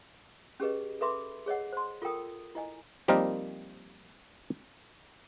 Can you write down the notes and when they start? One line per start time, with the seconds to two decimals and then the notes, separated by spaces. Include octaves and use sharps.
0.60 C#4 G4 G#4 B4 D#5
1.01 A4 B4 E5 B5 C6 D6
1.46 G#4 C#5 D#5 F#5
1.73 C5 C6
2.02 F4 A4 A#4 G5 D#6
2.55 E4 D#5 G#5
3.08 F3 G3 A#3 C4 D#4 A#4